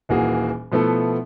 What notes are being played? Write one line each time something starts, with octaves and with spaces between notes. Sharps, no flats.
D#1 E3 A#3 F#4 G#4
B2 F3 A3 B3 E4 A4